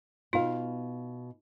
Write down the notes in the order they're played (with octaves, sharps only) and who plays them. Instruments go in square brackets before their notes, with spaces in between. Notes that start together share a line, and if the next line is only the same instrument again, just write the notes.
[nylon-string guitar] B2 F5 [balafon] D#4 F4